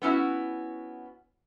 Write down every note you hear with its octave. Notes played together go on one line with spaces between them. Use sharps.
B3 C#4 E4 F#4